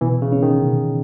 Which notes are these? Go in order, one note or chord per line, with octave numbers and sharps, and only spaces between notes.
B2 E3
C#3
C#4
D#3
B2